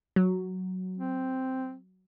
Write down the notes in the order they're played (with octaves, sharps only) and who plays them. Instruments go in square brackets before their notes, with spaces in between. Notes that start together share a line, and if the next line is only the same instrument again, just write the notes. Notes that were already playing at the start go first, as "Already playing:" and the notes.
[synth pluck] F#3
[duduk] C4